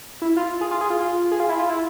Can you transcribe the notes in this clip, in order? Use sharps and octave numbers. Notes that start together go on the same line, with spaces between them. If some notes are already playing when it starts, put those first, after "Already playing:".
E4
F4
G#4
F4
G#4
F4
F4
G#4
F4
E4
F4
E4